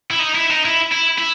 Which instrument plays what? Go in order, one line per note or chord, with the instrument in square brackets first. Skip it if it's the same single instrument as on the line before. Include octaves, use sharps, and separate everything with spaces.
[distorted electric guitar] E4
D#4
E4
D#4
E4
E4
E4